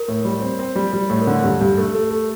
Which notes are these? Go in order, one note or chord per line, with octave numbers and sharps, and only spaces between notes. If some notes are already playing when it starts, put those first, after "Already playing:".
Already playing: A#4
A2
G3
C4
C4
G3
G3
A2
A#4
D3 A4
G2 G4
G2 G4
A3 A4
A3
A3